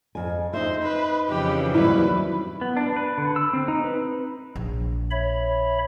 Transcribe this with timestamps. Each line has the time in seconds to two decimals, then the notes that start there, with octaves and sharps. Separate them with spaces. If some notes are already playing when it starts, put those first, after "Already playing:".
0.15 F2 G#5
0.53 D#4 C5 E5
0.82 B4
1.29 F2 C#3 E3 G4
1.74 D#2 F#3 G3 E4 B4
2.61 B3
2.77 D4
2.96 B4
3.18 D3
3.36 E6
3.53 C4
3.68 D#4
3.84 B4
4.56 A#1
5.11 C#5 E5 B5